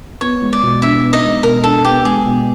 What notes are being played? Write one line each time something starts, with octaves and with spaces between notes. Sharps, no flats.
B3 C#5
G#3
D5
B2
D4 E4 E5
B3
D#4 D#5
G#3
B2 A#4
D4 A4
B3 G4
G#3 G#4
B2